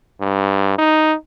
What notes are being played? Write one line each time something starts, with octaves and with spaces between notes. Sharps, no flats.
G2
D#4